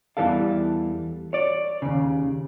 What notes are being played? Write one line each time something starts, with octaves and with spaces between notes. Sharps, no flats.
E2 B2 E3 G3 A4 F5
C#5 D5
D#2 C#3